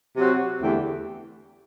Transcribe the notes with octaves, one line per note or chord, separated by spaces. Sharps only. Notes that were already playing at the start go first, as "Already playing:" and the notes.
C3 F#3 C4 F#4
E2 D3 A3 E4 G4